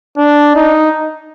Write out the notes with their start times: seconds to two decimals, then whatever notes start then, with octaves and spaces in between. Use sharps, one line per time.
0.18 D4
0.56 D#4